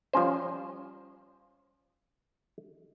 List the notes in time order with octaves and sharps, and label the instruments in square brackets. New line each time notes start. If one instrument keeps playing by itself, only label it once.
[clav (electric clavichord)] F3 G3 C#4 C5